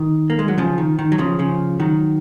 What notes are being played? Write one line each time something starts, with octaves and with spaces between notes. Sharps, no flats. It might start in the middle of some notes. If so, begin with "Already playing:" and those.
Already playing: D#3
A#3
G#3
F#3
C#3 F3
D#3
D#3
F#3
C#3 F3
C#3 F3
D#3 F#3